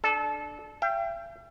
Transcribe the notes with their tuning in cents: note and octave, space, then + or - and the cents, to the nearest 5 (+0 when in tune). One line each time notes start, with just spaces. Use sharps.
D4 +20 A4 -25
E5 +45 G5 +0